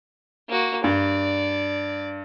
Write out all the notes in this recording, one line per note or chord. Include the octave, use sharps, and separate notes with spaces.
A#3 F#4
G2 D5